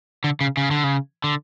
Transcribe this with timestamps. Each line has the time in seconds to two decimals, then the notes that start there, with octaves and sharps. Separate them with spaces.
0.24 D3
0.41 C#3
0.57 C#3
0.71 D3
0.84 C#3
1.24 D3